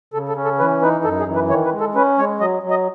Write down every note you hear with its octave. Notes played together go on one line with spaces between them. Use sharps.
C#3 A4
A4
C#4
A4
E3 B4
D#4 B4
F#2 A4
G#4
E3
B4
D#3 C#5
B4
G#3
A4
C#4 B4
G#3 C#5
F#3 D#5
F#3
D#5